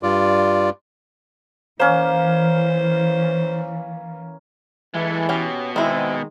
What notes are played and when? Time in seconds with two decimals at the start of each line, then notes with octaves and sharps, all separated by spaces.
0.03 G2 F4 D5
1.80 E3 A#3 C#4 C5
4.94 E3 G#3 A3
5.29 B2 C#4 G4
5.76 D#3 G#3 C4 E4 E5